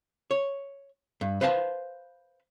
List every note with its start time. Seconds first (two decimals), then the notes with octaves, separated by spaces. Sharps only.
0.31 C#5
1.21 G2
1.41 B4 C5 F5 G5 A5